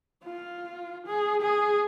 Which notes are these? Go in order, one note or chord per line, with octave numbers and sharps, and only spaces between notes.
F4
G#4
G#4